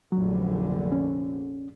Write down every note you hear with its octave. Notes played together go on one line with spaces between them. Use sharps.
F1 A#1 D3 F#3
C#4